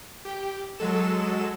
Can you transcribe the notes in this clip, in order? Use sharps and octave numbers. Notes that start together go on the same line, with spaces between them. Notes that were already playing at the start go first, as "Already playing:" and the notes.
G4
F#3 G#3 A4 E7